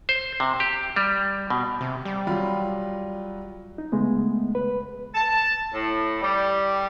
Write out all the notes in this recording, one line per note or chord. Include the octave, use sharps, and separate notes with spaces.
C5
C3
G4
G3
B2
C3
G3
F#3 F4 B5
D#4
C#3 G#3 A3 B3
B4
A5
A2
G3